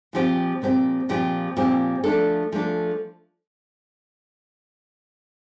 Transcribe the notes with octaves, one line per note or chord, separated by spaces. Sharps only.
A#2 F3 C4 G4
A#2 F3 C4 G4
A#2 F3 C4 G4
A#2 F3 C4 G4
F3 A3 D4 A4
F3 A3 D4 A4